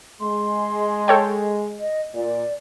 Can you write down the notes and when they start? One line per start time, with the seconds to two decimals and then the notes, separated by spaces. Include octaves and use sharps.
0.21 G#3 C6
1.08 A4 C#5 G5
1.80 D#5
2.14 A#2 D5